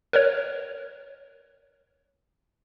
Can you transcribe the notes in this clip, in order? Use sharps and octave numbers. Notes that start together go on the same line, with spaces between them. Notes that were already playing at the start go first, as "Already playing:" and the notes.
A#4 B4 C#5